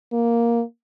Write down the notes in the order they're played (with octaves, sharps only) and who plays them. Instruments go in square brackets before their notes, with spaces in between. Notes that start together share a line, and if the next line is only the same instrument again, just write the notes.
[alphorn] A#3